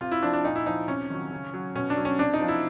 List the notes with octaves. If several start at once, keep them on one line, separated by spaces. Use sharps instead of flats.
C3 F4
E4
F3 D4
D4
A#2 D#4
E4
F3 D#4
C3 C#4
D#3 F#3
C#3
F#3
B2 C#4
D4
F#3
C#4
C3 D4
D#4
F3
E4